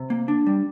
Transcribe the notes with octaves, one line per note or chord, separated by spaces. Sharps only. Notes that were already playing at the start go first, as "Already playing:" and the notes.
Already playing: C3
A#3
D4
G3